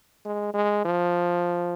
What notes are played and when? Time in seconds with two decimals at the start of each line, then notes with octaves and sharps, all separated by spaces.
0.25 G#3
0.54 G#3
0.85 F3